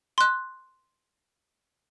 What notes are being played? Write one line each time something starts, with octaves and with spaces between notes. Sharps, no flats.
C6 F#6